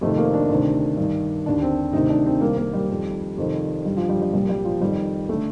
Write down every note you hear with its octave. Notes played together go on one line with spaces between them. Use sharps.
F2 C3 D#3 A3
A#3
D4
D2 C3 D#3
G2 D#3
D#2 D3 D4
C4
D2 C3 D#3 D#4
D4
C4
C2 C3 D#3 A#3
A#3
G3
F2 D#3
F2 C3 D#3
G2 D3 G3
F3
G3
G3
C2 A#2 G3
G3
F3
F2 D#3 G3
D3 A3